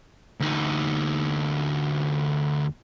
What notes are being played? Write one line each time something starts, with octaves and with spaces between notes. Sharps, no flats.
D2 D#4